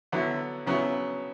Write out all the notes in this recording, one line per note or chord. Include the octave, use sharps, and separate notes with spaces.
D3 F#3 B3 E4
C#3 F#3 B3 E4